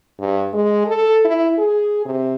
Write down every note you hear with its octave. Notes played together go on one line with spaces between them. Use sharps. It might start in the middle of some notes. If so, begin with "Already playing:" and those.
G2
G#3
A4
E4
G#4
C3